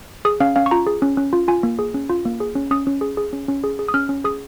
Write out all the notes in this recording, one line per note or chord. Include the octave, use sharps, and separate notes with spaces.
G#4 D#6
C#4 F5
C#4 F5
C#6
F4 A#5
G#4
C#4
C#4
F4
F4 G#5
A#3
G#4
C#4
F4
A#3
G#4
C#4
C#4 D#6
C#4
G#4
G#4
C#4
C#4
G#4
G#4
D#6
C#4 F6
C#4
G#4 D#6